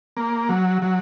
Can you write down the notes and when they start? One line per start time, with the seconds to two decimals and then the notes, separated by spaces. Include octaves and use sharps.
0.17 A#3
0.49 F#3
0.82 F#3